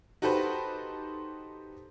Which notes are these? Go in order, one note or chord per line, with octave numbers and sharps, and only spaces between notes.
D#4 F#4 G4 A4 B4 C5